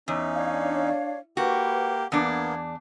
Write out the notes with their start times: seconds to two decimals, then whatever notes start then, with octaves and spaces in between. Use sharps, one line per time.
0.08 E2 C#4 D#4
0.34 D4 C#5 F5
1.37 A#3 F#4 G4 B4
2.12 E2 A#3 B3 D4 G#6